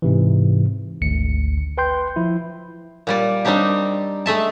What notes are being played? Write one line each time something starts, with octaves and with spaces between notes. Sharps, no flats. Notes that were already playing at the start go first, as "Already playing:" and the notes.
G#2 C3 E3
G#1 D2 C#7
B4 G5 C6 G6
F3 E4
A#2 G3 D5
G3 C4 D4 D#4 G4
G#3 A3 E5 A5